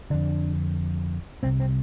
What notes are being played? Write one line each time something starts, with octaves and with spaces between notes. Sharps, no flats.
F2 D3 D4
C2 C3 C4
C4